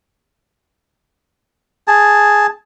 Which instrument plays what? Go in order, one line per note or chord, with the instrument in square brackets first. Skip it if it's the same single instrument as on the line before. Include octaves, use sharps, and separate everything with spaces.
[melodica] G#4 A5